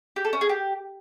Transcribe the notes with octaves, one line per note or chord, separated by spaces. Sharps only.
G4
A4
C#4
G#4
G4